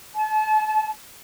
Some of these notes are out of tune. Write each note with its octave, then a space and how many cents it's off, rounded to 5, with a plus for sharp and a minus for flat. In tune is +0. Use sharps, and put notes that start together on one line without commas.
A5 -35